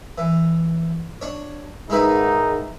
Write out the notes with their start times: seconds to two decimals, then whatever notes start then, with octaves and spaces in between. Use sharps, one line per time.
0.18 E3
1.21 D4 C#5
1.90 G#2 D#3 G#3 D#4 E4 B4